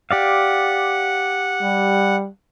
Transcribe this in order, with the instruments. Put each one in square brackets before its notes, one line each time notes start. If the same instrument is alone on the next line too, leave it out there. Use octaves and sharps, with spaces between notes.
[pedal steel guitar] G4 D5 F5 [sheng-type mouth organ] F#5
[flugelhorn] G3